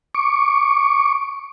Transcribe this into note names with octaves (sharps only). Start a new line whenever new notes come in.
C#6 D6